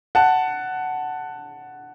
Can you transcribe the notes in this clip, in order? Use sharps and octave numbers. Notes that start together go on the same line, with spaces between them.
F#5 A5